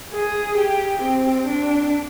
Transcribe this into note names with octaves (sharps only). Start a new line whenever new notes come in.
G#4
G4
C4
D4